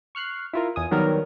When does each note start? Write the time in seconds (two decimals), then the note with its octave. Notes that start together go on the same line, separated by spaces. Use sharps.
0.15 C#6 F6 F#6 C7
0.53 E4 F4 A#4
0.76 E2 G#5 D#6
0.91 D#3 F#3 G3 B3 A#4